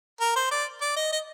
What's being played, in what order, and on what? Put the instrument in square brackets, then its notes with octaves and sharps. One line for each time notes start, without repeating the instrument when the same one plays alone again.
[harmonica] A#4
C5
D5
D5
D#5
D#5